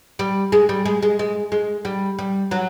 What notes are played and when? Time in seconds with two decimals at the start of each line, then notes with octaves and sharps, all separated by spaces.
0.19 G3
0.52 G#3
0.69 G3
0.85 G#3
1.02 G#3
1.19 G#3
1.52 G#3
1.85 G3
2.19 G3
2.51 F#3